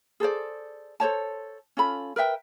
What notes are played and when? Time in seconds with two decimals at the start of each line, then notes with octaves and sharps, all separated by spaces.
0.20 G#4 A4 C5 D5
1.00 A4 C5 C#5 A5
1.77 C#4 F4 A4 B5
2.16 A#4 B4 E5 G5